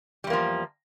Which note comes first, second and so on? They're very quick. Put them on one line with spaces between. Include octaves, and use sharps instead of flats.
G3 E2 A#3 F3